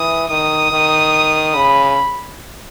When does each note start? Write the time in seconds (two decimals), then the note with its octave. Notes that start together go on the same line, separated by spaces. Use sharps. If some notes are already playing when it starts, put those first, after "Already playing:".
Already playing: E3 D#6
0.30 D#3 D#6
0.72 D#3
1.55 C#3 B5